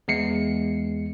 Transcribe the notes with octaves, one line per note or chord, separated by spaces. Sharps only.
E2 G#3 C7 C#7